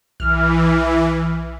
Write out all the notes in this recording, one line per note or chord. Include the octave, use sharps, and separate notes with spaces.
B1 E3 F6